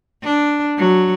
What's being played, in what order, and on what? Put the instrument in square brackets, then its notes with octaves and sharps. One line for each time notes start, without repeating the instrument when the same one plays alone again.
[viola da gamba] D4
F#3